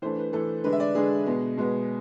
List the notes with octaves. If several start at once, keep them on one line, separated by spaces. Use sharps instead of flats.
E3 A3 D4 C5
B4
E3 A3 D4 A4
D3 G#3 D4 B4
E5
D5
D3 G#3 D4 G#4
B2 G#3 B3
B2 G#3 B3